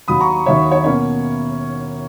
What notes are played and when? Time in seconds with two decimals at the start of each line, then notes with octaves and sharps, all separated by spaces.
0.08 D#2 D#3 F#3 B5 D#6
0.21 A#5 C#6
0.46 D#2 D#3 F#3 C#5 E5
0.71 C#5
0.84 B2 A#3 C#4 C#5